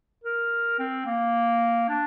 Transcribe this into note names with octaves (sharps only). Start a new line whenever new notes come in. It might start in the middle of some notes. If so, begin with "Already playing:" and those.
A#4
C4
A#3
D4